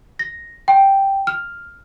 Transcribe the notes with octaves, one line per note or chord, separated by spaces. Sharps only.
A#6
G5
F6